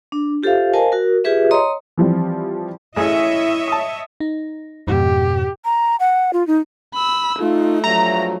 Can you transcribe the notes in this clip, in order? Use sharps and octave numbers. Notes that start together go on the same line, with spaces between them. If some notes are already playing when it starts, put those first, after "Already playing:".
D4
F4 G4 A4 C5 E5 F5
A#4 C5 D#5 F5 G#5 A5
F#4 A#4
F4 G4 G#4 B4 E5
C#5 D#5 A#5 C6 D#6
E3 F3 G3 C4
A1 E4 G#4 C#5 D#5 E5
A5 D#6
D#4
F2 G#2 B2 G4
A#5
F#5
F4
D#4
B5 E6
A3 D#4 F4
G2 F3 F#3 E5 A#5